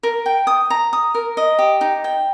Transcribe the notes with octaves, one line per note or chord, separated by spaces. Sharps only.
A#4
G5
D#6
A#5
D#6
A#4
D#5
G4
D#4
G5